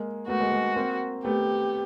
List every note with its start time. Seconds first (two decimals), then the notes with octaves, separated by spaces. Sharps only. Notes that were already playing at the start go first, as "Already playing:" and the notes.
Already playing: G#3 A#3
0.28 A3 B3 F#4
0.40 G#3 A#3
0.52 G#3 A#3
0.76 A#3 C4
1.24 A3 B3 G4